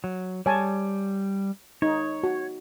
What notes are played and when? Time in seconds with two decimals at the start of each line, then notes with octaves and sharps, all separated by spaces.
0.04 F#3
0.46 G3 C#5 G#5 A5
1.82 D#4 C#5
2.24 F#4